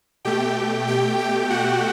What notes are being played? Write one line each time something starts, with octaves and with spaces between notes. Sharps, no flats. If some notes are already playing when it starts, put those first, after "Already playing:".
B2 A3 G4 G5
G4 G5
G4 G5
F#4 F#5